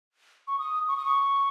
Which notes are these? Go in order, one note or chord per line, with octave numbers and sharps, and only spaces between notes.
C#6
D#6
C#6
D#6
C#6